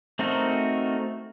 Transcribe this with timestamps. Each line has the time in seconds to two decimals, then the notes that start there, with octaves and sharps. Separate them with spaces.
0.19 A3 C4 D#4 F#4 A#4